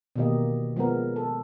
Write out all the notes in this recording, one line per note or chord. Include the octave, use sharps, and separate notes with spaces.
B2 D#3 E3 A#3 G4 D#5
F3 G#3 B3 A#4
A4